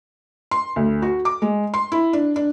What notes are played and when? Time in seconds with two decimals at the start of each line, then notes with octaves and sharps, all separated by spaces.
0.51 C6
0.76 D2
1.02 F#4
1.25 D6
1.42 G#3
1.74 C6
1.92 E4
2.13 D4
2.36 D4